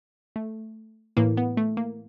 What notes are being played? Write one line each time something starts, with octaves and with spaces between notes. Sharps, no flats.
A3
A2 E3 A#3
B3
A3
A#3